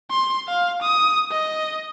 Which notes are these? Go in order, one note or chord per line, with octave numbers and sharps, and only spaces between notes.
C6
F5
D#6
D#5